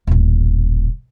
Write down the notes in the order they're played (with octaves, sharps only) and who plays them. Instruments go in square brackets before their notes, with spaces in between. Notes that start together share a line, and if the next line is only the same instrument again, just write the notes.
[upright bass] D#1 A1